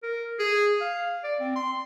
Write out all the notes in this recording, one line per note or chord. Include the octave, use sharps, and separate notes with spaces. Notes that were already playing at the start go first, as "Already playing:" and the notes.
A#4
G#4
F5
D5
C4
C6